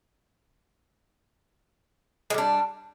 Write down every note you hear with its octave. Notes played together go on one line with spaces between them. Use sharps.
G3 G#3 D4